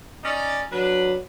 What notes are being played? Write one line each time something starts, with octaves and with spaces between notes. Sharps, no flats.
C#4 D#4 D5
F#3 D4 B4